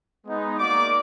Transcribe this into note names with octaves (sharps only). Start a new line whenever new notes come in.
G#3 B3 D#4
A#3 D#4 F#4 D5 D6